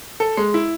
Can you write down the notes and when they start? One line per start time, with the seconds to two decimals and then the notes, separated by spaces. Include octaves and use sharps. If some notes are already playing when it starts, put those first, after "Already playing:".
0.20 A4
0.37 G#3
0.54 E4